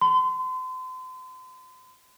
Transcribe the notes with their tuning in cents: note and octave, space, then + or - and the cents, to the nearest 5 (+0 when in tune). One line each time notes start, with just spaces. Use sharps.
C6 -40